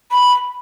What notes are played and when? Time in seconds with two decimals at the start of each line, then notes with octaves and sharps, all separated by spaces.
0.12 B5